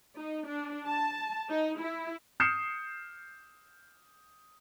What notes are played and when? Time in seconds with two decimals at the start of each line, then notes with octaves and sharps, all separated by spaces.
0.16 D#4
0.47 D4
0.86 A5
1.50 D#4
1.81 E4
2.40 D#6 F6 G6 C7 C#7 E7